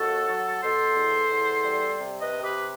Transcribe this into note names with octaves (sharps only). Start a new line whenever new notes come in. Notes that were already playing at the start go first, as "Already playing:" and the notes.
Already playing: D#2 F#4 A4
F#3
B2 A4 C5
E2
E2
G3
C3
B4 D#5
C3
G4 B4